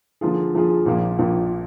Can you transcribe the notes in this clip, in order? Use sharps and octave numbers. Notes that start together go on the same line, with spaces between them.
D3 F3 A#3 F4 G#4
D3 F3 A#3 F4 G#4
A#1 A#2 F3 A#3
A#1 A#2 F3 A#3